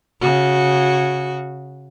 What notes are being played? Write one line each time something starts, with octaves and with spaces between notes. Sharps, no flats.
C#3 F#4